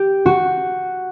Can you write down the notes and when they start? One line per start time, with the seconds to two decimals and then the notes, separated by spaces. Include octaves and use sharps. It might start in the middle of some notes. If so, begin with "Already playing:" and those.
Already playing: G4
0.26 F#4